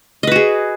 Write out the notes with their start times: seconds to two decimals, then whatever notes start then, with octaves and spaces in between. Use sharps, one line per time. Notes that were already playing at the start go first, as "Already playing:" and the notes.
0.23 D#5
0.27 B4
0.32 F#4
0.36 G#4